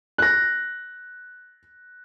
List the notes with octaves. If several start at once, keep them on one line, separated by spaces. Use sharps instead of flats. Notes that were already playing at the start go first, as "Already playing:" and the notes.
F#6 A#6